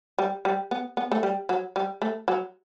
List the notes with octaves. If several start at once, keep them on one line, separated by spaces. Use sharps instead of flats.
G3
G3
B3
B3
A3
G3
F#3
G3
A3
F#3